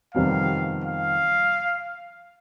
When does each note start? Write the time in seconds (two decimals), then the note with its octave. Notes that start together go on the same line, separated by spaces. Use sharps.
0.14 F2 C3 D#3 G3 B3 F5
0.84 F5